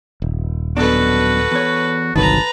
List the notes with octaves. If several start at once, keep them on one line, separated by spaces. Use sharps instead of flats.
D#1
F#2 B2 D4 F#4 A4 B4
E2 C#5
G1 C2 D#3 F#3 B4 A5 A#5